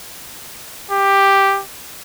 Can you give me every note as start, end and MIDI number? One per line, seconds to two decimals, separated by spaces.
0.90 1.62 67